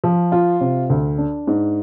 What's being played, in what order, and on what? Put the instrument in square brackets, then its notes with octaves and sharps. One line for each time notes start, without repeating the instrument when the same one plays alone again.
[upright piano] F3
F4
C3
D2
D4
G#2